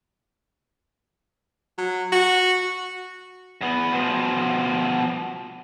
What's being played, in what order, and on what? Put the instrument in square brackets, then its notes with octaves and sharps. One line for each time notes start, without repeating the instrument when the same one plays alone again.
[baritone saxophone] F#3
F#4
[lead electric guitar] E2 B3
B2 F3